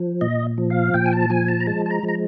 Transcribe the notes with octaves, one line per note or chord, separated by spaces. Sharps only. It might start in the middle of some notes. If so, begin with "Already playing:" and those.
Already playing: F3
A#2 D#5
F3
F5
A#2 G5
G#5
A5
F3 G#5
A5
A#5
G#3 A5
A5
A#5
F3
A#5